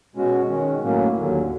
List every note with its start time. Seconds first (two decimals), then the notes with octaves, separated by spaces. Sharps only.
0.15 B2 G#3 C#4 F#4
0.48 D#3 G#3 C#4
0.82 A2 F#3 A#3 C#4
1.15 D#2 D3 F#3